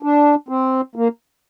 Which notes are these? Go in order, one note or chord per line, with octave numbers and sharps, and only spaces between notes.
D4
C4
A#3